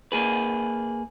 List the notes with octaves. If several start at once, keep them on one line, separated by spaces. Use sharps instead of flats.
A#3 G#4 B4